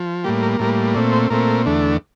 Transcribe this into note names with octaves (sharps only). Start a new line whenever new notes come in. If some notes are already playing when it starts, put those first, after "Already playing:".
Already playing: F3
A2 G3 A#3 G4
A#4
A2 G3 A#3 A#4
A#2 A3 C4 D5
C5
A#2 A3 C4 A#4
E2 D3 A3 D4